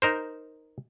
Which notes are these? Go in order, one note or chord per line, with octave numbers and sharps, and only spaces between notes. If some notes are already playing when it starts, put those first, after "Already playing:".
D#4 A#4 C5